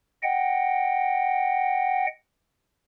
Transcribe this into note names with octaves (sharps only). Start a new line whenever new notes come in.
D#5 F#5 G5